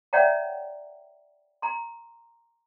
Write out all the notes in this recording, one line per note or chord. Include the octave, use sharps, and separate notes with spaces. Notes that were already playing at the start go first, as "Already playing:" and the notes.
C#5 D5 E5 F#5 G5 A#5
A#5 C6